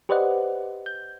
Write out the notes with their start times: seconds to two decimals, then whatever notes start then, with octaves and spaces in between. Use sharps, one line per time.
0.09 G4 B4 C5 D5 D#5 F#5
0.86 G6